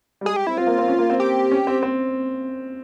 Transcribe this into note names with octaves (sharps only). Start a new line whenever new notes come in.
G3
G#3 G#4
G4
C4 E4
C4 F4
A#3
C4
C#4
A#3
C4
G4
C#4
C4
C4